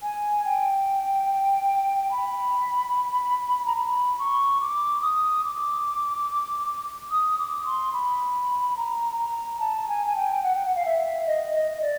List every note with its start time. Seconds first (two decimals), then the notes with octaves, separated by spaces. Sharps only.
0.02 G#5
0.45 G5
2.11 B5
3.66 A#5
3.77 B5
4.19 C#6
4.61 D6
5.01 D#6
5.44 D6
7.10 D#6
7.38 D6
7.65 C6
7.93 B5
8.76 A#5
9.18 A#5
9.59 A5
9.88 G#5
10.06 G#5
10.15 G5
10.43 F#5
10.55 G5
10.64 F#5
10.75 F5
10.85 E5
11.26 D#5
11.55 D#5
11.81 D5